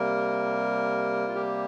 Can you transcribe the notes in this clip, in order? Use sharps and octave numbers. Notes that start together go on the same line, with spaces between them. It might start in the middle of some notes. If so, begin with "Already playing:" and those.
Already playing: C3 G3 A#3 A#4
F4
G4